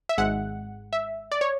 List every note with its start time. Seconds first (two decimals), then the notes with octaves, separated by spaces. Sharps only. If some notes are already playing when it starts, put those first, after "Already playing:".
0.09 E5
0.18 G#1 G#2 G#3 F#5
0.93 E5
1.32 D5
1.41 C#5